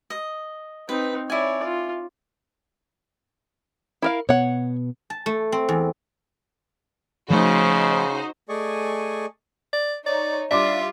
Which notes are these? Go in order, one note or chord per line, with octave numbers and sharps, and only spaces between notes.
D#5
C4 D#4 B4
E4 C#5 D5 G#5
F4
E4 A#4 F5
B2 B3 C#5 F#5
A5
A3
C4
E2
C#3 F3 A3 D#4 F#4 C5
A3 G#4 D5 D#5 G#5 C#6
D5
D#4 C#5 D5
G3 D4 F4 E5 D6